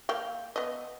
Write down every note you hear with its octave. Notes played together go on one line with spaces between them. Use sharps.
A#3 F5 G5
B3 D#5